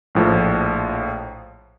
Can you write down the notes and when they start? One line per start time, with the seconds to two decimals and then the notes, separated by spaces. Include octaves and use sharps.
0.15 A#1 A2 F3